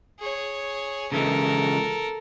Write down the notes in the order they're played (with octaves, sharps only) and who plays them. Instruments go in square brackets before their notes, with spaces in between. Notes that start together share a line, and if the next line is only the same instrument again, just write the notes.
[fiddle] G#4 C#5
[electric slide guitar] C#3 E3 G#3 [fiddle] A4 A#4